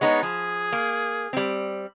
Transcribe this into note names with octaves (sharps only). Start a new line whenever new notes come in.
G#3 B3 D#4 C#5
F3 G#4
A#3
G3 C4